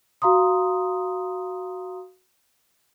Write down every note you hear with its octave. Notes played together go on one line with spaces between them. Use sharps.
F#4 F5 A#5 C6 D#6